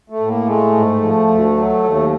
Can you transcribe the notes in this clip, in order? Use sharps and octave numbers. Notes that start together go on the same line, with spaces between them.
A3
A2
A#3
G#3 A3
G#2
F3
D2
F#3
D#2